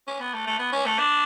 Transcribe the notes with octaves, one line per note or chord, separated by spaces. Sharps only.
C#4
B3
A3
A3
B3
C#4
A3
D4